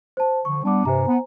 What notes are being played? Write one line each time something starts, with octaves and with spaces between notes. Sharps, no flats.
C5 A5
D3 F3 C#6
G3 B3 D4 A5 D6
G2 C3 C5 G#5 A#5
B3